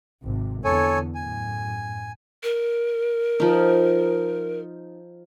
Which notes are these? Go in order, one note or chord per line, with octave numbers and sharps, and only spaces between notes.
G#1 C3
E2 D3 A4 C#5 G#5
F#2 A2 G#5
A#4
F3 D#4